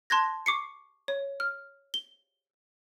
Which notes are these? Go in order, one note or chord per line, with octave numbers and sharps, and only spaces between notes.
A5 C6 F#6 G#6 A#6
C#6 D6 C7 C#7
C#5
F6
G7